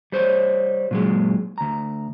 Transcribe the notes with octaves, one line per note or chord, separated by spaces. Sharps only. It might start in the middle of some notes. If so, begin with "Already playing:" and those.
G3 C5 C#5
A#2 F#3 G#3
D2 A#5